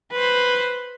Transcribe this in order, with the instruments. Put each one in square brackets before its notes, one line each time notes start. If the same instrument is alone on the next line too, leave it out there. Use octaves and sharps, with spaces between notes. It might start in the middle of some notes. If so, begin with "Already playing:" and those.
[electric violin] B4 C5